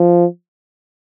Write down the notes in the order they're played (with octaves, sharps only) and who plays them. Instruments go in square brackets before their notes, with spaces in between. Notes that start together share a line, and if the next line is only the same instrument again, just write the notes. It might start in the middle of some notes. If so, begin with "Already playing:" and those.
Already playing: [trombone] F3